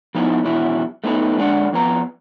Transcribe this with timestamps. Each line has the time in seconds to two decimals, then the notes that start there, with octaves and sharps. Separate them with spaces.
0.15 F3 B3 D#4 E4
0.44 F#2 B2 E3 F#3 E4
1.04 A3 B3 D#4 B4
1.38 D3 G#3 D4 D5 E5 F#5
1.72 F2 B3 A#5